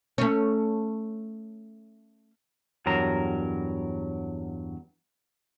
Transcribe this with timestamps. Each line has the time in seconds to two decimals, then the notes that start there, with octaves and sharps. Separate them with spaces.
0.18 A3 C#4
2.86 E2 G2 F#3 A#4 A#5